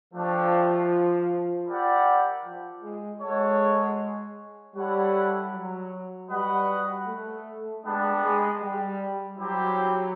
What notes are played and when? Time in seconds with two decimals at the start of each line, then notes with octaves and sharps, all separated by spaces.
0.12 F3 A3 D4 G4
1.66 E4 G4 A#4 D5 F#5
2.44 F3
2.82 G#3
3.21 G#3 F#4 A4 C#5
4.75 G3 E4 A4 C#5 F#5
5.52 F#3
6.29 G3 F#4 B4 D#5 F#5
7.06 A3
7.83 G3 G#3 B3 D4
8.22 G#3
8.61 G3
9.37 F#3 G3 C4 E4 G4 C5